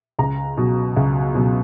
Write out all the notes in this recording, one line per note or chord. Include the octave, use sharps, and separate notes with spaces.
C#2 A#5
B2 F#3
C#2
B2 F#3